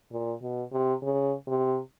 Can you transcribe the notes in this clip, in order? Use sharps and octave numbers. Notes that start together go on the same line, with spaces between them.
A#2
B2
C3
C#3
C3